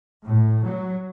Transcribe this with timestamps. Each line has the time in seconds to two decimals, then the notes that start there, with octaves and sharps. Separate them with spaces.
0.24 A2
0.63 F#3